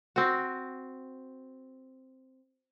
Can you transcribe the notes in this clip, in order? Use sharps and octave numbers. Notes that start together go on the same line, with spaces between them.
C4 F#4